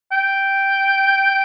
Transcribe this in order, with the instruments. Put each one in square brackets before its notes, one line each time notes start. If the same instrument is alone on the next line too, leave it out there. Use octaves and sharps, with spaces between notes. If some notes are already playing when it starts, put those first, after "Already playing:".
[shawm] G5